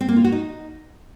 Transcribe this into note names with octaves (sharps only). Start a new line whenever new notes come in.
C4
A#3
F4
F#4
D#4